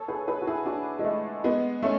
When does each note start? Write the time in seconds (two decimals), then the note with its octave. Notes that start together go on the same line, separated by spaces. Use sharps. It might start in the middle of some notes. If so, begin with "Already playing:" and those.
Already playing: A4 C#5
0.08 G#4 B4
0.28 G#4 B4
0.42 F#4
0.47 E4 G#4
0.66 D4 F#4
0.99 G#3
1.05 A3
1.44 G#3 B3
1.82 A3 C#4